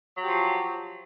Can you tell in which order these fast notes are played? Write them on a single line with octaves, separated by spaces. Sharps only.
F#3 G4 F3